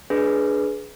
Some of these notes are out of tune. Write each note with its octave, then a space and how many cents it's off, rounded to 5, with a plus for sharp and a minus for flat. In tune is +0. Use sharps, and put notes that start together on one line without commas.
D4 +0 G#4 +15 B4 +0